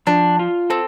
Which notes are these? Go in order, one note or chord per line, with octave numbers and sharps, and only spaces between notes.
F3 D4
F4
C4 A4